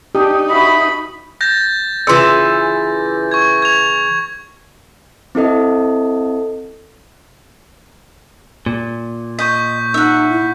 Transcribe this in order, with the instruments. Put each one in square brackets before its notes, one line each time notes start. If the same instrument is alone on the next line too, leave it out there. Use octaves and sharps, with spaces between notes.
[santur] D4 [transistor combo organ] D#4 [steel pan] G4
[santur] E4 F#4 D#5 [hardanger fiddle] B5
[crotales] G6 A6 A#6
[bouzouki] C#3 E3 [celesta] F4 C6 E6
[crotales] C#6 G#6
G#6 F7
[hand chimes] C4 E4 A4 D#5
[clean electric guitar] A#2
[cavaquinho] D#5 [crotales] C#6 G6 B6
[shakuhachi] D#4 [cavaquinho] E5 F#5
[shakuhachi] E4